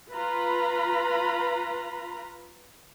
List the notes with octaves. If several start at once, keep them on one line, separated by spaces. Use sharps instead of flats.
F4 B4 A#5 B5